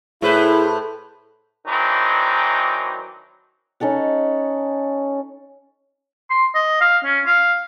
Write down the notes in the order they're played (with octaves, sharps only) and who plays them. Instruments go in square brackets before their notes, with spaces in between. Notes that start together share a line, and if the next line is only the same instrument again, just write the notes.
[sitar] A2 B4 C5 [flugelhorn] E4 [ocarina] G#4
[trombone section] D#3 E3 F#3 C4 D4 D#4
[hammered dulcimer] C#4 D#4 A4 F#5
[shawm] C6
D#5
F5
C#4
F5